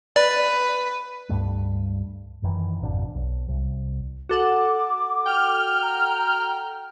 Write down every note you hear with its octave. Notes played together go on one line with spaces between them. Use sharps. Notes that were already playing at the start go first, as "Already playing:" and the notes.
B4 D5
C#2 G2 G3 A3
F#1 F#2 D#3 E3
G#1 F2 B2 D4
B1
C2
F#4 A4 F#5 D6
G5 F6
A#5